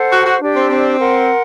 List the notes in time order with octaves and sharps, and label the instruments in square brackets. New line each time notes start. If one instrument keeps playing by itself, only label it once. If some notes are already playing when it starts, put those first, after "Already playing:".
Already playing: [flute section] A4 C5 F#5
[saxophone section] F#4
F#4
[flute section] D4 G4 D5
[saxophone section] C4
C4
[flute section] A#4 F#5 C6